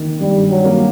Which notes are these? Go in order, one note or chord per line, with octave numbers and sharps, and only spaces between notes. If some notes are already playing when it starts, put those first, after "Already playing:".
Already playing: D#3 A#3
G2 G3
F#3
A#3